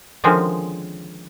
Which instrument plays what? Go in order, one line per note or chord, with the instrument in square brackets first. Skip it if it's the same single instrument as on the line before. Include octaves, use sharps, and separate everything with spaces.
[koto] D3 D#3 F3 G#3 C4 C#4